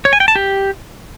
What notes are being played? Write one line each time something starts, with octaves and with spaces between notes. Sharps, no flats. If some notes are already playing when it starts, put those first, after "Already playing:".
C#5
G#5
G5
A5
G4